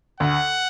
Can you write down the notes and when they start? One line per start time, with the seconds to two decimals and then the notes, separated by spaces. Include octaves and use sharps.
0.20 D2 F#5